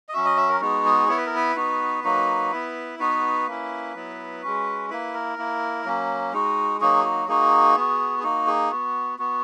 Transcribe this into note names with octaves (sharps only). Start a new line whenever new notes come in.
D#5
F#3 C#4 F#4 E5
D#5
E5
A#4
G#3 B3 D#4 F#4
G#4
B3 E4 C#5
B4
A#4
B4
B3 D#4 F#4
F#3 A#3 D#4 F#4
B3 E4
B3 D#4 F#4 B4
A#3 C#4 E4
F#3 B3 E4
G#3 C#4 F#4
A#3 E4 B4
A#4
A#3 E4
F#3 A#3 C#4
G#3 D#4 F#4
F#3 A#3 D#4 F#4 G#4
F#4
A#3 D#4 F#4 G#4
B3 F#4
G#4
A#3 D#4 F#4
G#4
B3 F#4
B3 F#4